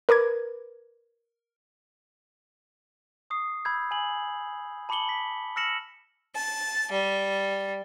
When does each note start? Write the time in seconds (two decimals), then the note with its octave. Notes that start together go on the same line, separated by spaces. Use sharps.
0.09 A#4 B4 D6 G#6
3.30 C#6 D#6 C7
3.65 B5 E6 G6 G#6
3.91 G#5 F#7
4.89 A5 B5 D6 C#7 F#7 G7
5.09 B6
5.56 E6 F6 A#6 C#7 E7 F#7
6.35 A5
6.92 G3